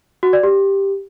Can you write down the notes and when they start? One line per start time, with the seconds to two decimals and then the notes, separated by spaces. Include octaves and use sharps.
0.23 F#4
0.33 D5
0.43 G4